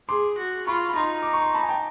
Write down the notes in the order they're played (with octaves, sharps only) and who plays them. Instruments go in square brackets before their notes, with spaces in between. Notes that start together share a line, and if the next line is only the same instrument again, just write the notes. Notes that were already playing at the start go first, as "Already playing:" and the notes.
[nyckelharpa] G#4 [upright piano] C6 D6
[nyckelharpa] F#4
[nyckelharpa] F4 [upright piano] B5 C#6
[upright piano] B5
[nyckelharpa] D#4 [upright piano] A#5 C6
[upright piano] D6
C#6
C6
A5 B5
G#5
G5 A5